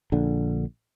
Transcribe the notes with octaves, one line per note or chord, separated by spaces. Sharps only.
A#1 D3